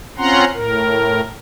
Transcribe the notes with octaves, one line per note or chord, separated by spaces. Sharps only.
C4 C#4 F4 F#5 A#5 C6
A2 A#4